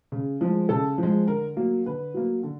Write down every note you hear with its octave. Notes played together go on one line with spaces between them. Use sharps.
C#3
F3 G#3
C#3 A4
F3 G#3
D3 A#4
F#3 A#3
D3 B4
F#3 A#3
D3